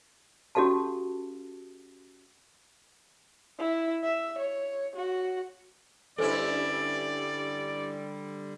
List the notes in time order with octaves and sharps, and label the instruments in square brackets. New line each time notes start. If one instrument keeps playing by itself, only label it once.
[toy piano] C#4 F#4 G4 A4 F5 A5
[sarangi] E4
E5
C#5
F#4
[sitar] G2 C#4 E4 [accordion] D3 G3 [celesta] A4 C5 [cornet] D5